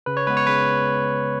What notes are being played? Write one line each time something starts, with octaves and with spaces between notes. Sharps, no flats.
C#3 B4
C#5
G#3 B3 B4
C#5
C#3 B4